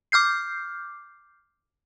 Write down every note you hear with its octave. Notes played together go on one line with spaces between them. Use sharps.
D6 F6 G6 C7